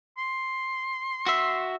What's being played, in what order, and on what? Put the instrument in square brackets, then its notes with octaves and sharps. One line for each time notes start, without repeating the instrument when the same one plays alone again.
[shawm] C6
[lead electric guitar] F#4 E5